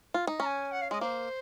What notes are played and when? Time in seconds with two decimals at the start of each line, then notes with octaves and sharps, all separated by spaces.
0.14 F4
0.27 D#4
0.40 C#4 A#5
0.45 G#5
0.71 F#5
0.81 F5
0.90 G#3 D#5
1.01 A#3 C5